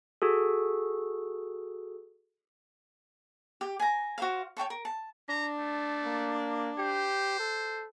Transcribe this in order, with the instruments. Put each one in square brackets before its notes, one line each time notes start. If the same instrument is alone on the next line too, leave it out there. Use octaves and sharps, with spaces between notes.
[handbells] F#4 G#4 A4
[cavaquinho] G4
G#5 A#5
F#4 C5 F5
C#5 G5 A5 C#6
A#4
A5
[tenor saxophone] D4 [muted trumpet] A#5
[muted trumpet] A3
[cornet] A#3
[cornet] G4 [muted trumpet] C5
[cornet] A4